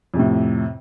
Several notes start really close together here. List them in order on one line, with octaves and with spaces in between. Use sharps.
F2 C3 A2